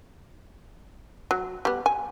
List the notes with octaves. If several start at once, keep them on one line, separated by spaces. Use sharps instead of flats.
F#3
G3 B3
G#5